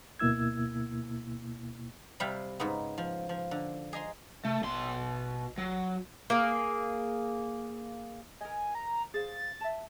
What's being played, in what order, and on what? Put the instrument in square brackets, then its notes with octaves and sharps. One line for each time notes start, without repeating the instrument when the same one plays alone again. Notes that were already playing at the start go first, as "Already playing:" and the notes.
[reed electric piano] D2 B2 A#3 E4 E6 G#6
[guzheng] C3 G3 F5 G5 B5
G#2 C#3 B3
F3
F3
D3
G#4 D#5 A#5 C6
[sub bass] C3 [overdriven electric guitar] A3
[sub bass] A1 [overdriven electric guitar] B2 C6
[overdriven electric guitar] F#3
[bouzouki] A#3 G#4
[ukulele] A#4 D#5 [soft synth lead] G#5
[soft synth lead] A#5
[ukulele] G#4 C5 F5 [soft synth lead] A6
[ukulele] E5 A5